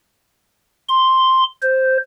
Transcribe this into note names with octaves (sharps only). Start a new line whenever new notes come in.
C6
C5